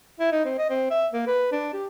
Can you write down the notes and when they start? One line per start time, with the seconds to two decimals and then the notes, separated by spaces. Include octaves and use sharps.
0.20 E4
0.31 D#4
0.45 C4
0.58 D#5
0.70 C4
0.90 E5
1.13 A#3
1.27 B4
1.52 D4
1.73 G4